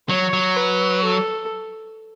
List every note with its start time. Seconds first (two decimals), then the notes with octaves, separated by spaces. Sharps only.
0.09 F#3 C#5
0.33 F#3
0.56 B4
1.04 A4